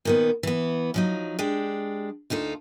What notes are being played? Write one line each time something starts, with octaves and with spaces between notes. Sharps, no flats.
A#2 D#3 B3
E3 B3
F3 F#3 D#4
G#3 D4 G4
D2 D#4 F4 A4